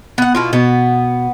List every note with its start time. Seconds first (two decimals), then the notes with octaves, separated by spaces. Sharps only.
0.18 B3 F#5
0.35 B2 E4 F4
0.53 B2 B3